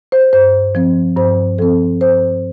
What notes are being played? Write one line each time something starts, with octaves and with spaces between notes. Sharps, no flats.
C5
G2 C5
F3 C4
G2 C5
F3 C4 A4
G2 C5